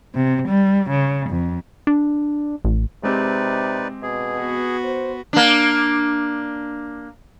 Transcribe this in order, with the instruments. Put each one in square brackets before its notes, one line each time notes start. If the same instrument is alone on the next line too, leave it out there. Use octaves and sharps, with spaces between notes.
[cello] C3
G3
C#3
F2
[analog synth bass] D4
A1
[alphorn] C3 [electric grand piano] G#3 C4 G4 [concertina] D#4 B4 D5
[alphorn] B2 [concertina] G#4
[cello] B3 F#4
[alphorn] C5
[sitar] A#3 D4